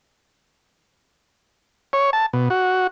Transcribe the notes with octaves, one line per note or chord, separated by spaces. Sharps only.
C#5
A5
B2
F#4